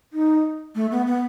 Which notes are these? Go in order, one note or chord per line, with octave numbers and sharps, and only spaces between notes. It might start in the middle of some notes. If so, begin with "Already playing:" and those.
D#4
A3
B3
B3